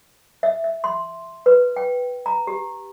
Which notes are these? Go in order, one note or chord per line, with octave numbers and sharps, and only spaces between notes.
E5
E5
C6
B4
G5
A#5
G4